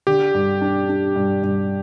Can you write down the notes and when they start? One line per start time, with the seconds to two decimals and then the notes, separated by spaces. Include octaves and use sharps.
0.07 D3 G4
0.35 G2
0.61 D4
0.89 D4
1.16 G2
1.43 G2